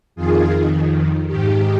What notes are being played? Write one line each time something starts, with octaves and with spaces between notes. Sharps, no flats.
F2 D#3 F4 G#4
G#2 D#3 G4